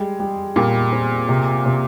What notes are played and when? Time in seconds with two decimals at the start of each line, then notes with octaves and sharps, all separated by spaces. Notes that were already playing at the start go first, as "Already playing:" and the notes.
Already playing: G3 G#3
0.20 G3
0.56 A#2 G3 A#3
0.92 C4
1.29 C3
1.66 C3